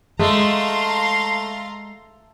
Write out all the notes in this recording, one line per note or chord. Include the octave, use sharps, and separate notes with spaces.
G#3 A3 F5 A#5 C6